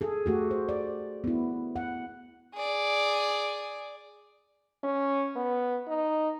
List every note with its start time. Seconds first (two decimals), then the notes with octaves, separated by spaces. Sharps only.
0.01 G#4 A4
0.26 A3 F#4 G4
0.51 C5
0.69 D5
1.24 B3 E4
1.76 F#5
2.55 G#4 D5
4.84 C#4
5.35 B3
5.88 D#4